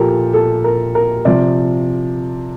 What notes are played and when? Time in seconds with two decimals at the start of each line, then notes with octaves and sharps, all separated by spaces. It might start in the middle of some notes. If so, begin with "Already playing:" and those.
Already playing: A#2 F3 G4 A4 A#4
0.33 A4
0.64 A#4
0.95 A#4
1.25 C3 F3 D5